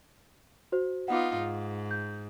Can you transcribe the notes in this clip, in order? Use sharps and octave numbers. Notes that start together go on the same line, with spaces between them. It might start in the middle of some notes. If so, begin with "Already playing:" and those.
F#4 C5
B3 D#4 F4 F#5 D6
G#2
G6